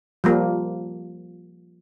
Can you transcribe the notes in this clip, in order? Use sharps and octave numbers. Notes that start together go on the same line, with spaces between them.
F3 G3 A#3